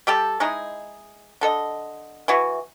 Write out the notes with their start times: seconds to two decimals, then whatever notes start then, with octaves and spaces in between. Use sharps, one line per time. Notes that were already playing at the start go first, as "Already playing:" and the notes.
0.07 G3 G4 A4
0.40 G#3 D#4 E4 G#4
1.41 D3 A4 D#5
2.28 E3 E4 F#4